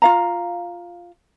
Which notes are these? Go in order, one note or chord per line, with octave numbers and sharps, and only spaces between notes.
F4 F5 A#5